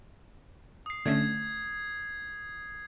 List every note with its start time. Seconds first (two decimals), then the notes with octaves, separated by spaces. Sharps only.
0.86 D#6 C7
1.06 D3 A3 C#4 G#6